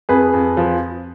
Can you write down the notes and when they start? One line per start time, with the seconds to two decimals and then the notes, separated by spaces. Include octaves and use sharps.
0.09 F2 G#4 B4
0.33 F2
0.57 F3